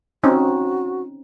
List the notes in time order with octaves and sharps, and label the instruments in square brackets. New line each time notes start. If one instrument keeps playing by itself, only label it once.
[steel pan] C4 C#4 D#4 [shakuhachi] F#4